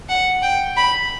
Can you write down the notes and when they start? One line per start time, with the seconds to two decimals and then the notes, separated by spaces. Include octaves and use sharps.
0.09 F#5
0.42 G5
0.77 B5